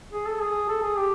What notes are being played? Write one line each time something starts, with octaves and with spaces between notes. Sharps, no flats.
G#4
A4
G#4
A4
G#4
G4